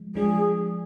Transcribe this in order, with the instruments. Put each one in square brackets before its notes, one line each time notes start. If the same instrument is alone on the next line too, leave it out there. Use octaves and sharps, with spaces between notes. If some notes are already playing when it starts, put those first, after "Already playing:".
Already playing: [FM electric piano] F3 G#3
[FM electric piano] F3 G#3 D4 [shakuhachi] G#4